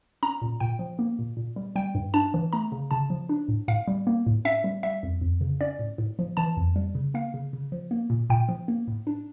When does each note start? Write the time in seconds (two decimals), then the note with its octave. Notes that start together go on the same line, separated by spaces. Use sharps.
0.23 C#4 A#5
0.42 A#2
0.60 A#2 G5
0.79 F3
0.99 A#3
1.19 A#2
1.37 A#2
1.56 G3
1.76 G3 G5
1.95 G2
2.14 D4 A5
2.34 E3
2.53 A3 A#5
2.72 C#3
2.91 C#3 A5
3.10 F3
3.29 D4
3.49 A2
3.68 A2 F5
3.88 G3
4.07 A#3
4.26 A2
4.45 C#4 E5
4.64 G3
4.83 G3 E5
5.03 F2
5.21 F2
5.41 C#3
5.61 C#4 D5
5.79 A2
5.98 A2
6.19 F3
6.37 E3 A5
6.57 F2
6.76 G3
6.95 C#3
7.14 A#3 F5
7.34 C#3
7.53 C#3
7.72 F3
7.91 A#3
8.10 A#2
8.30 A#2 G5
8.49 F3
8.68 A#3
8.88 A2
9.07 D4